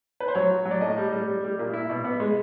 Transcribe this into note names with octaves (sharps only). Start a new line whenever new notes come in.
B4
C5
F#3 C#5
F#4
F#3
D5
A2 D#5
G3
G3
G3
G3
A#2
E4
B2
B3
G#3